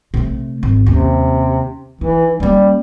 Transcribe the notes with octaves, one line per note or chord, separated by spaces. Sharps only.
C3 A3
G#1
D#2 C3 C#4
E3 D#4
G3 A#3 C#4